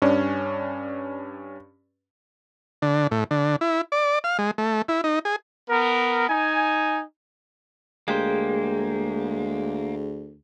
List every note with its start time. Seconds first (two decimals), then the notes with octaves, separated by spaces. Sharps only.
0.02 G2 C#4 D4
2.82 D3
3.11 A2
3.31 D3
3.61 E4
3.92 D5
4.24 F5
4.38 G#3
4.58 A3
4.88 E4
5.04 D#4
5.25 G#4
5.69 B3 A#4
6.28 D#4 G#5
8.08 D2 G#3 A#3 G4 G#4 C5